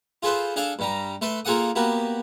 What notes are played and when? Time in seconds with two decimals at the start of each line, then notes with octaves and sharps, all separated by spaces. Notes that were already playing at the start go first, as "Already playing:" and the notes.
0.23 F4 G#4 A4 B4 C5
0.56 D4 G#4 A4 F5
0.79 G2 G3 A#5
1.22 A3 A4 B4 C6
1.45 A#3 F4 G#4 A4 F#5 D#6
1.76 A#3 B3 F#4 G4